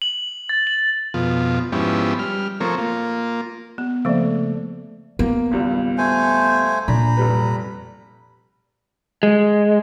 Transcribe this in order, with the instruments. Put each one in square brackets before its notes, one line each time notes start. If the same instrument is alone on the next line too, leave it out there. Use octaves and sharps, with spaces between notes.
[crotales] F#7
A6
F#7
[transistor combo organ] F2 B2 F4
G#2 F3 B3 C#4 E4 G4
G3 F6
F3 A3 C4 A#4 C#5
A#3 F4
[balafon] B3
[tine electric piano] C#3 A3 D5 [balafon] F3 A#3
[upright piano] A#3 [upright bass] B3
[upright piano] G#1 C#2 G3
[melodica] A3 C5 G#5
[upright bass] A#2 [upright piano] D4 [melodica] A#5 B5
[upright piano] F1 G3 B4
[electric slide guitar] G#3